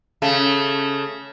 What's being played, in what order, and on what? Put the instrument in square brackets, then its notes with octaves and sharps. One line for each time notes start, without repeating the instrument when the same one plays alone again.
[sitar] C#3 A3